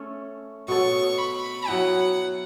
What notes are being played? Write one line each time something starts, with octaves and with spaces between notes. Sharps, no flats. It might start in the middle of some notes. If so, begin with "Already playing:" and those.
Already playing: A3 C#4 A4 C#5
B2 B3 A4 C#5 C#6
B5
F#3 B3 E4 F#5